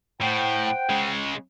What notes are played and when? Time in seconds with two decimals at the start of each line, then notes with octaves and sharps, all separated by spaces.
0.22 A2 C5 F#5 G5
0.90 C#3 G#3